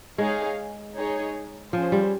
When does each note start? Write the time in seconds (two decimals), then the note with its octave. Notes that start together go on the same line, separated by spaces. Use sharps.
0.18 G#3 D#4 G#4 C#5 F5
0.95 D#4 G#4 C#5
1.73 F3 C#4 G#4 C5
1.92 G3